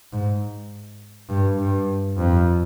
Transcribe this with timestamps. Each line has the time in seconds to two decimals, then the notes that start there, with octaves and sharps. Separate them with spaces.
0.12 G#2
1.29 G2
1.58 G2
2.17 F2